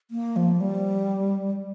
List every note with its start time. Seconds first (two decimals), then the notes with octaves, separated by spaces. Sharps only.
0.11 A#3
0.36 F3
0.60 G3